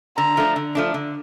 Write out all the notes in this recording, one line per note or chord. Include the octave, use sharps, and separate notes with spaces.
D3 A#5
F3 A3 D4
D3
F3 A3 D4
D3